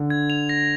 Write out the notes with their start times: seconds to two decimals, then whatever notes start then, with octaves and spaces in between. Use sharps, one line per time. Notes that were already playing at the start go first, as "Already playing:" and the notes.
Already playing: D3
0.10 G#6
0.30 F7
0.49 A#6